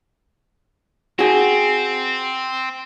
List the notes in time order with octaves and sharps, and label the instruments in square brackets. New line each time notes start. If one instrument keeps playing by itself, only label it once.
[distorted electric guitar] C4 [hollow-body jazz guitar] F#4 G#4